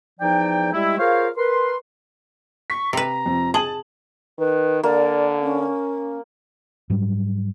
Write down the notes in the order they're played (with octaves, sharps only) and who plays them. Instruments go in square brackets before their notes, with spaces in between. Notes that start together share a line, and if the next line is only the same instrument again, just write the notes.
[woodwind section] E2 F3 D#4 D5 G5
G3 G#3 E4
F4 G#4 A#4 C5 C#5 F5
A#4 B4 C6
[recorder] C#6 [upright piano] B6
[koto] C3 B4 [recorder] A#5
[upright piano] F2
[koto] G#4 [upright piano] A5 F#7
[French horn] D#3 [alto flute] B4
[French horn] D3 [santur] A#3 [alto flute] D5
[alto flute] C#4
[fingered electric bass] G#2 F#3 G3